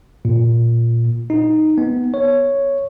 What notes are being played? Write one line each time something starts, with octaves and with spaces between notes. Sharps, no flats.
A#2
D#4
B3
C#5